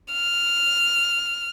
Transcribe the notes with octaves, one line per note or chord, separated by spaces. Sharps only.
F6